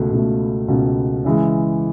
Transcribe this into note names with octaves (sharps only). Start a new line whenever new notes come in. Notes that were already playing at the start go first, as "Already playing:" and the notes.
Already playing: C#2 B2 A3
C#2 B2 A3
C#2 B2 A3
C#3 E3 G#3